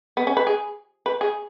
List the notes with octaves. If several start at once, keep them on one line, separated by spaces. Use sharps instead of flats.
B3
C#4
B4
G#4
B4
G#4